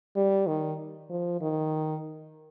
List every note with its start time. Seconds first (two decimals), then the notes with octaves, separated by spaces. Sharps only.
0.16 G3
0.47 D#3
1.09 F3
1.41 D#3